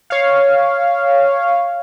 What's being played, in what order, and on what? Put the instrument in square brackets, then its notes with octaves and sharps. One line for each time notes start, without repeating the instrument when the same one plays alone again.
[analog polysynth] C#5 F5